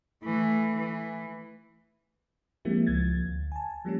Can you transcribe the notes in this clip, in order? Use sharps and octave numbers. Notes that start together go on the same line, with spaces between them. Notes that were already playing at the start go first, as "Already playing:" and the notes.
E3 A3
E3
F3 G#3 A#3 C4 E4 G4
C#2 F3 G#6 A6
D2
G#5 A5
F3 G3 A#3 C#4